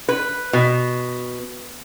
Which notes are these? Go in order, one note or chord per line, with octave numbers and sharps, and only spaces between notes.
B4
B2